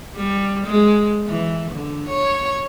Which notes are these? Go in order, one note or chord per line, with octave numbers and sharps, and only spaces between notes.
G3
G#3
E3
D3
C#5